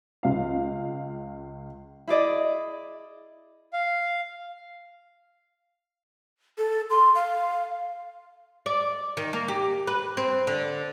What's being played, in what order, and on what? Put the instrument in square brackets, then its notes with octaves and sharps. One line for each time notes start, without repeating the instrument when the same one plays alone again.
[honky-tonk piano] C#2 F5
[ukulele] E4 G#4 D5 D#5
[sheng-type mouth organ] F5
[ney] A4
C6
F5
[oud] D5
D#3
A#3
G4
B4
C4
D3